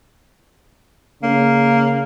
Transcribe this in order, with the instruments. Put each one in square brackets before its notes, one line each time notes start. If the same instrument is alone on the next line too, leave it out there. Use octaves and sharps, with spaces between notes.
[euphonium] C#3 [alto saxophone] A#3